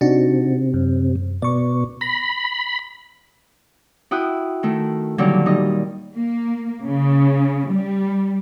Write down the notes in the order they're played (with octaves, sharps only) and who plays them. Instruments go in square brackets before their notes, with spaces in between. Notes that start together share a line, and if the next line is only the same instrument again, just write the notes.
[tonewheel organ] C3 [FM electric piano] D4 D#4 F#4
[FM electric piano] F#2
[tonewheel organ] B2 [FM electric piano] D5 C#6
[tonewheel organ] B5 [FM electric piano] A#6
[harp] E4 F#4 G5 D#6 F#6
D#3 A3
A#2 D3 D#3 F#3 G3
G3 D#4 D#5
[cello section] A#3
C#3
G3